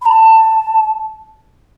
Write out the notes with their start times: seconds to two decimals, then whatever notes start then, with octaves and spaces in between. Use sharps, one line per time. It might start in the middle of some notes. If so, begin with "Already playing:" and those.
0.02 B5
0.06 A5